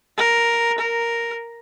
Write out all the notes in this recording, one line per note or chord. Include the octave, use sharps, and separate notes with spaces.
A#4
A#4